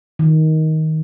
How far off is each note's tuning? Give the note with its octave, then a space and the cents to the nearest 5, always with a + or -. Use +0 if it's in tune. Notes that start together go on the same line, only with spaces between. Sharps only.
D#3 +15